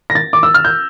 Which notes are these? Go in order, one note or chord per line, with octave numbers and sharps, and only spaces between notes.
A#6
A6
D6
E6
F6
G6